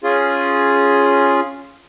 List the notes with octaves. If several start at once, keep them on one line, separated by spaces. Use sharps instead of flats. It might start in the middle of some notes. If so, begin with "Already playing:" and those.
C#4 F4 G#4